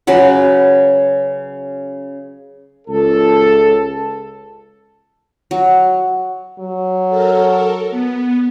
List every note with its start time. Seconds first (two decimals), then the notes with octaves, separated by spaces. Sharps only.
0.07 C#3 F#3 B4 F#5
2.88 C#2 A4
5.51 F#3
6.59 F#3
7.09 A4 A#4
7.90 B3